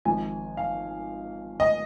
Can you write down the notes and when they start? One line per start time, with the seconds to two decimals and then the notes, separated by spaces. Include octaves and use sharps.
0.05 G#1 G#2 F3 G#5
0.57 F5
1.60 D#5